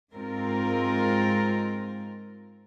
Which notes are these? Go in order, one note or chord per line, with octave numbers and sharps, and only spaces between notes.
G#2 G#3 C4 F4 A#4